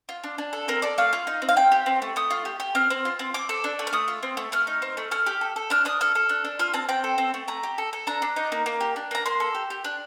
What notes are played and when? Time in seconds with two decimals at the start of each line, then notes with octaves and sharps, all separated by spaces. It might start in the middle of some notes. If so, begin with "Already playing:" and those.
0.09 F4
0.24 D4
0.38 D4
0.53 A4
0.68 C4 A#4
0.82 A4 D5
0.98 A3 F5
1.13 F4
1.27 D#4
1.42 C4
1.49 F5
1.56 C4 G5
1.72 G4
1.86 C4
2.02 A3
2.16 A3 D#6
2.31 F4
2.45 G4
2.60 G4
2.75 C4 F6
2.90 C4
3.05 F4
3.19 C4
3.34 C4 D6
3.49 A4
3.64 D4
3.79 A3
3.87 F6
3.93 A3 D#6
4.08 F4
4.23 C4
4.37 A3
4.52 A3 F6
4.67 D#4
4.82 C4
4.97 A3
5.11 A3 F6
5.26 G4
5.41 A4
5.56 A4
5.70 D4 F6
5.85 D4 D#6
6.01 A4 F6
6.15 A4
6.29 D4
6.45 D4
6.59 F4 F6
6.74 C4 A5
6.89 C4 G5
7.04 A4
7.18 C4
7.34 A3
7.48 A3 A#5
7.63 G4
7.78 A4
7.93 A4
8.07 D4 A#5
8.22 D4
8.36 D#4
8.52 A#3
8.66 A#3
8.81 G4
8.96 D4
9.11 A#3 A#5
9.26 A#3 C6
9.40 A4
9.55 G4
9.70 G4
9.84 D4